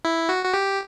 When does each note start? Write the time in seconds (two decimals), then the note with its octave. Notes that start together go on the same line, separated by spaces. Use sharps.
0.05 E4
0.29 F#4
0.45 F#4
0.54 G4